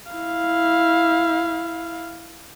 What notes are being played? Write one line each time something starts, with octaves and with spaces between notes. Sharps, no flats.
E4 F5